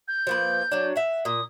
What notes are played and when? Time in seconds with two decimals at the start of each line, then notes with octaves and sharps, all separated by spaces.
0.08 G6
0.27 F3 A#3 B4
0.72 F#3 D4
0.96 E5 F#5
1.25 A#2 D#6